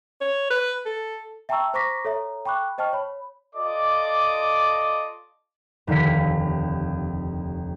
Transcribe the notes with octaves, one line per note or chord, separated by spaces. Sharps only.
C#5
B4
A4
E5 G5 A5 A#5 C#6 E6
C5 A#5 C#6 D6 A#6 B6
A4 C#5 E5 A#5
G5 B5 C#6 D6 F#6
C5 D#5 G5 A5 C#6 F6
C#5 B5
F4 A4 D5 D#5 D6
F1 D#2 D3 F5 B6